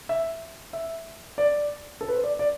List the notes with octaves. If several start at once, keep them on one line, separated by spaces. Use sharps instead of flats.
E5
E5
D5
A4
B4
C5
D5
D5